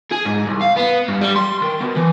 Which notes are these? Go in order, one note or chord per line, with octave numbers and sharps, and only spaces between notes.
G#4
G#2
C2
F5
B3
G2
G3
C6
D#3
B2
E3